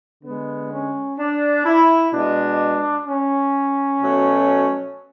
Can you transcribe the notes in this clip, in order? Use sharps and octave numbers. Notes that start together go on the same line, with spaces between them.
D3 G#3 B3
C#4
D4
E4
B2 G#3 D4
C#4
B2 F#3 A3